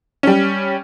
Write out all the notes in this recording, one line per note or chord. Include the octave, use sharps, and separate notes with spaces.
G3 C#4